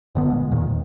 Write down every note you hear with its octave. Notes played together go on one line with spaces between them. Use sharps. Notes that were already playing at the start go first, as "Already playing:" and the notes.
F1 D3 B3
A#2 G#3
E2 A#2 D#3
D#2